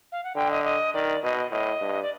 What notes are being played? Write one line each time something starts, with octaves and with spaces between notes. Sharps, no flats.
F5
F#5
D3 G5
D#5
D#5
D#3 D5
B2 D#5
A2 D#5
G2
D5